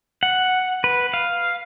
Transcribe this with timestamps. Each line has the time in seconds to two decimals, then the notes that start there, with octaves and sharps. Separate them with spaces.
0.23 F#5
0.84 B4
1.14 F5